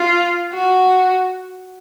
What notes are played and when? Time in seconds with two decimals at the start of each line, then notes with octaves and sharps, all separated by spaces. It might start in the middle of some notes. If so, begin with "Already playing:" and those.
Already playing: F4
0.53 F#4